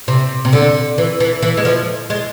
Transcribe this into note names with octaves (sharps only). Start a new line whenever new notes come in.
C3
C3
D3
E3
E3
E3
G#3
F3
G#3